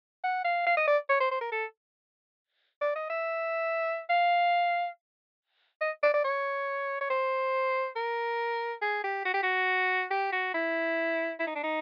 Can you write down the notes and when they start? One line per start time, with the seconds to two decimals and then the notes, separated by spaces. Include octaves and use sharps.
0.24 F#5
0.45 F5
0.67 F5
0.77 D#5
0.88 D5
1.09 C#5
1.20 C5
1.31 C5
1.41 A#4
1.52 A4
2.81 D5
2.96 D#5
3.10 E5
4.10 F5
5.81 D#5
6.03 D5
6.14 D5
6.25 C#5
7.01 C#5
7.10 C5
7.96 A#4
8.82 G#4
9.04 G4
9.25 F#4
9.34 G4
9.43 F#4
10.11 G4
10.32 F#4
10.54 E4
11.39 E4
11.47 D#4
11.55 D4
11.63 D#4